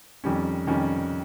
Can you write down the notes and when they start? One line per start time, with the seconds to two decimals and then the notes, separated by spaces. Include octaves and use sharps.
0.24 F2 D#3 G3 C#4
0.67 F2 D#3 G3 C#4